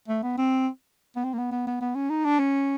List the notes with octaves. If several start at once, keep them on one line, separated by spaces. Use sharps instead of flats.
A3
B3
C4
B3
C4
A#3
B3
B3
B3
B3
C#4
D#4
D4
C#4